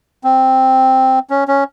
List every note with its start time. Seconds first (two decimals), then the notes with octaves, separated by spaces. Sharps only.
0.24 C4
1.30 C#4
1.48 C#4